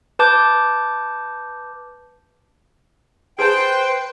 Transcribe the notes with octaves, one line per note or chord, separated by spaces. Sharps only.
B4 A5 D6 G6
G#4 B4 C5 G5 A5